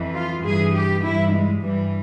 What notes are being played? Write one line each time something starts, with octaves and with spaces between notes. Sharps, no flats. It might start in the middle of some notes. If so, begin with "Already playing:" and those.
Already playing: F2 E3
F4
G2 E3 G#4
G4
G2 E3 E4
G#3
G2 E3 G3